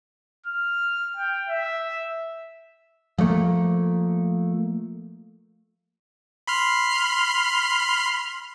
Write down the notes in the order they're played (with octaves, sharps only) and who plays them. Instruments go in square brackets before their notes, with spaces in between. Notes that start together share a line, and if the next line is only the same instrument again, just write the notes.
[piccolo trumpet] F6
G5
E5
[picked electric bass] F3 G3 A3 A#3
[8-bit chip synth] B5 C6 F6